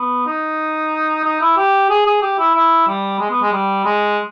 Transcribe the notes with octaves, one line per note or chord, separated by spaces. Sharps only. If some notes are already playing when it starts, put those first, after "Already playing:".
Already playing: B3
D#4
D#4
E4
G4
G#4
G#4
G4
E4
E4
G3
G#3
B3
G#3
G3
G#3